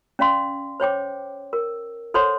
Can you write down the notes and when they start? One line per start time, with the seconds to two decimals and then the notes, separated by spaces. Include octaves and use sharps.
0.19 C#4 D5 F5 C6
0.80 C5 C#5 G5 D6
1.53 A#4
2.14 A4 C5 C#5 F#5 C6